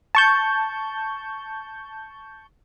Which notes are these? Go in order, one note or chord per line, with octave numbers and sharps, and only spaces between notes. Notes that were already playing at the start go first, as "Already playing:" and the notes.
A5 C#6 G6